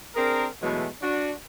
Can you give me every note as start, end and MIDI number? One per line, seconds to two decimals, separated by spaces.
0.16 0.46 60
0.16 0.46 62
0.16 0.46 68
0.16 0.46 70
0.62 0.87 47
0.62 0.87 52
0.62 0.87 54
0.62 0.87 56
0.62 0.87 57
1.02 1.32 62
1.02 1.32 66